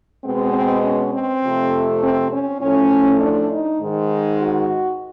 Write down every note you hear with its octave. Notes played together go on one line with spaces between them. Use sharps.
B2 G#3 B3 C4
C4
C#4
C4
F2 C3 F3 A3
C4
C#4
A2 F3 A3 C#4
D4
D#4
G#2 D#3 G#3
F#4